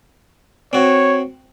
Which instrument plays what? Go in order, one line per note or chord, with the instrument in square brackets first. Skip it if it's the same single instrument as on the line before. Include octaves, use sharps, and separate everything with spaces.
[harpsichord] C4 F#4 [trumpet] C#5